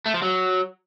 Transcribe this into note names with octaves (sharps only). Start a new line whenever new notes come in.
A3
F3
F#3